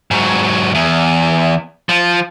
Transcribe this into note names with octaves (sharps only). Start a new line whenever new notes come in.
G#2 F#3
E2
F3